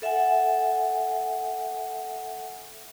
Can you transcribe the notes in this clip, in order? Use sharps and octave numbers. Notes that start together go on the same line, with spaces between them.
A4 E5 F#5 G#5